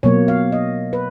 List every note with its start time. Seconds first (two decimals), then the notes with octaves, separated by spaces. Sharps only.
0.03 B2 F#3 A#3 C#5
0.28 F5
0.52 D#5
0.93 B4